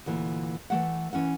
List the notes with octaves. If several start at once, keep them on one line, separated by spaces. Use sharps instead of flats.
D2 A#2 E3
E3 A3 F#5
E3 C#4 E4 F#5